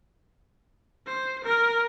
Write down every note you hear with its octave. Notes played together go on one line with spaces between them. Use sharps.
C5
A#4